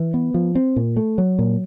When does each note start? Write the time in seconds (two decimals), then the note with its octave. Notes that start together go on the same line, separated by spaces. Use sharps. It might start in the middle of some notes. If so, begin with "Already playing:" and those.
Already playing: E3
0.14 B3
0.34 F3
0.55 C4
0.76 A#2
0.97 A3
1.18 F#3
1.39 A#2